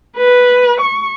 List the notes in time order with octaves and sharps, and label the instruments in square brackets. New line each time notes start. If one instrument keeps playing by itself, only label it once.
[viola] B4
C#6